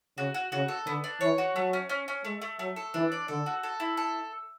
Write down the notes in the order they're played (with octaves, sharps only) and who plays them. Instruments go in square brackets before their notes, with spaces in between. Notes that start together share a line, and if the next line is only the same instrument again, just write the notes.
[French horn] C#3 [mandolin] F#4
[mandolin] F#4
[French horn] C#3 [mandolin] F#4
[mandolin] A4
[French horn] D3 [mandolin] B3
[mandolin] D4
[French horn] E3 [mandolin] C#5
[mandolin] F#4
[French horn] F#3 [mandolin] A3
[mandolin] C#4
C#4
C#4
[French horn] G#3 [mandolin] A3
[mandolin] A3
[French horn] F#3 [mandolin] A3
[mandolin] A4
[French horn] E3 [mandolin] D4
[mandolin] D5
[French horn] D3 [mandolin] A4
[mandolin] F#4
A4
E4
A4